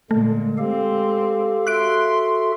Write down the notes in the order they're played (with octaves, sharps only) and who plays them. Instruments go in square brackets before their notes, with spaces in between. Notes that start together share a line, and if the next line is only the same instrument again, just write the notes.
[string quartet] A#2 [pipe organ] D3 G#3 [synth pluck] A3
[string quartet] G#3 C4 [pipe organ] G4 A4 F5
[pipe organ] F#4 A4 E5 [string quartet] C6 [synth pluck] F#6 D7